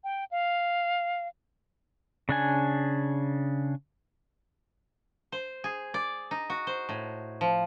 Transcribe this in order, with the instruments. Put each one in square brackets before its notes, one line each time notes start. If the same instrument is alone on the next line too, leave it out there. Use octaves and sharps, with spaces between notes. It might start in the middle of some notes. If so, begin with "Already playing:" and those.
[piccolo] G5
F5
[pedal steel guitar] C#3 D4 G#5
[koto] C5
G#4
D5
D#4
F#4
C5
A2
F3